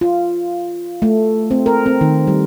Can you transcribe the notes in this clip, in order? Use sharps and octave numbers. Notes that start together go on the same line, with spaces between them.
F4
A3
C4
A#4
C4
D#3
G3